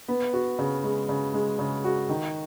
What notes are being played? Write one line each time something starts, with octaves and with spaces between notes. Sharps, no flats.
B3
F#4
C#3
G#3
C#3
G#3
C#3
F#4
D#3